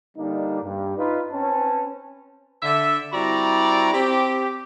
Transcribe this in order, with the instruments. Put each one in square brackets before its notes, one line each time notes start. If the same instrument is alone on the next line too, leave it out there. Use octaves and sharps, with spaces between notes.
[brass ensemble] D3 G3 A#3 D4 D#4
G2
D#4 F4 B4
C4 C#4 B4 A5
[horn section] D3 E5
G3 C4 E4 F#4 D5 A#5
C4 G4